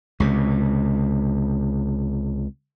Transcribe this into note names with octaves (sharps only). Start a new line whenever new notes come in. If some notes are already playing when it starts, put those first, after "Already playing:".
C#2 C3